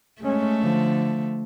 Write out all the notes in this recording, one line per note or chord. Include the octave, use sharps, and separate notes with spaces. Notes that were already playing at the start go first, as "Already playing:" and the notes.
G#3 A3 C#4
D3 F3